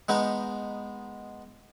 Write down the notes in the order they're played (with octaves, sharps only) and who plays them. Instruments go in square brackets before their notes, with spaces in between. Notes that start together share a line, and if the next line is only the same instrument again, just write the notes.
[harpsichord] G#3 B3 D#4